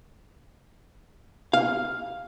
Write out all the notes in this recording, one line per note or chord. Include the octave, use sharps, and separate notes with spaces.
F5